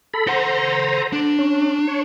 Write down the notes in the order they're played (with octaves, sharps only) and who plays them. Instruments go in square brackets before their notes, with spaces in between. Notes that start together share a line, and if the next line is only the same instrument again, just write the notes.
[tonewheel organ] A4 B5
[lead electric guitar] A4 F#5 [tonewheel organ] C5 A#5
[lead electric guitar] D4
[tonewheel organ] C#4
C#5